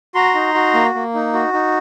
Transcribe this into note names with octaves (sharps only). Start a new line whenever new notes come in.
F#4 A#5 C6
D#4
F#4
A#3
A#3
D#4
F#4
D#4